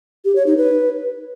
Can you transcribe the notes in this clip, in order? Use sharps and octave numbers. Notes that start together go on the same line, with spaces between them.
G4
C#5
D#4
B4